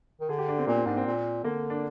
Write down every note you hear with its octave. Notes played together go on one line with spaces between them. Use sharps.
D#3
D3 G#4
G4
D4
C4
A#2 A#3
C4
G#2 D4
C4
A#2
D3 A#3
D4